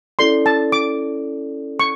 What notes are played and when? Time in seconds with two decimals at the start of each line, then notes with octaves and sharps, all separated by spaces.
0.19 C#4 E4 A4 D5 C6
0.46 A5
0.72 D6
1.80 C#6